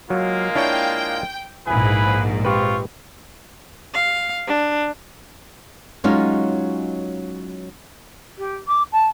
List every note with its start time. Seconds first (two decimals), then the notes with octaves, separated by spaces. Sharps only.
0.10 F#3 G#3 A#3 F4
0.55 D4 E4 C#5 G5
1.67 A#1 G#2 E4 G#4 B4 G#5
2.45 C4 F4 G4 B4 C#6
3.94 F5
4.47 D4
6.04 F#3 G#3 C#4 D#4 F4
8.38 G4
8.68 D6
8.92 A5